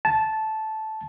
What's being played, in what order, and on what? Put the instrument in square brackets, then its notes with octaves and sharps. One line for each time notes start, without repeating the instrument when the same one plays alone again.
[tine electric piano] A5